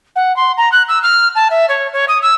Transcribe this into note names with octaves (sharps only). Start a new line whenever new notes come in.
F#5
C6
A#5
F#6
E6
F6
A5
E5
C#5
C#5
D#6
E6